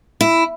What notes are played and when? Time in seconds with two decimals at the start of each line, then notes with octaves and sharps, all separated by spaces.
0.21 E4